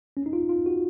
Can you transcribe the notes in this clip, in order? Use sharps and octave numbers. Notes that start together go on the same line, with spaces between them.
C#4
D#4
F4
F4
F#4